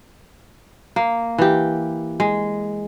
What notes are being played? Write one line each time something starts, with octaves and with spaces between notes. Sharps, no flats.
A#3
E3 G4
G#3